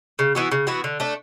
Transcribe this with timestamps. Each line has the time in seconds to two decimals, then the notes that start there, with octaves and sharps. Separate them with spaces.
0.19 C#3
0.35 E3 B3 F#4
0.51 C#3
0.67 E3 B3 F#4
0.84 D3
1.00 A3 D4